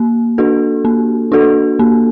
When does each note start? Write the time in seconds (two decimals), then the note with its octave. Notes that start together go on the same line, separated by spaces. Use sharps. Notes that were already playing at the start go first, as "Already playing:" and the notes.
Already playing: A#3
0.38 D4 F#4 A4
0.85 A#3
1.32 D4 F#4 A4
1.79 A#3